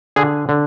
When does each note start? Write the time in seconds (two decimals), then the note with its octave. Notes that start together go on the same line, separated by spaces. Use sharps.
0.16 D3 G#4
0.49 D3